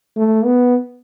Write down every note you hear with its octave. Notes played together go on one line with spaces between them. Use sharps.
A3
B3